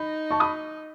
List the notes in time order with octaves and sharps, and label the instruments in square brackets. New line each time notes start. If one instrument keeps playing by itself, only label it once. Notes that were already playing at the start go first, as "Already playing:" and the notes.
Already playing: [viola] D#4 [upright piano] B5
[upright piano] A5 C#6
B5 D#6